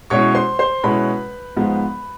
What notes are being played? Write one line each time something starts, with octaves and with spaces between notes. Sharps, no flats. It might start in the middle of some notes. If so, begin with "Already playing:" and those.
B2 G#3 C#4 E4 C#5 C#6
C5 C6
C5 C6
B2 G#3 C#4 E4 B4 B5
G#2 F3 G#3 B3